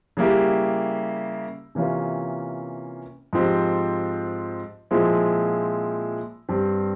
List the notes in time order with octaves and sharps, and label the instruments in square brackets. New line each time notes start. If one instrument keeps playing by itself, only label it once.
[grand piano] C#3 G3 A#3 E4 G4
C3 E3 A#3 C#4 F4
G#2 F3 C4 G4
A#2 F3 G#3 C4 E4
G2 G3 C4 G4